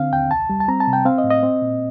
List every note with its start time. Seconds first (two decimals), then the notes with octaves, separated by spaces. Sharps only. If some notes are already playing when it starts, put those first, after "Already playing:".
Already playing: D3 C4 F5
0.13 D#2 G5
0.31 C2 A5
0.50 G3
0.60 A5
0.68 C4 A#5
0.80 A5
0.87 C3
0.93 G5
1.05 C4 F5
1.18 D#5
1.24 A2
1.30 D#5
1.43 C4
1.62 A#2